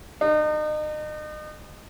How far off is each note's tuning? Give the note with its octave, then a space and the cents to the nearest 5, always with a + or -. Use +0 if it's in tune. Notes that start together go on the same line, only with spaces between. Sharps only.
D#4 -35